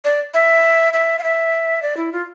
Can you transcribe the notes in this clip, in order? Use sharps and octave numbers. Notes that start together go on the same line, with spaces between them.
D5
E5
E5
F5
E5
D5
E4
F4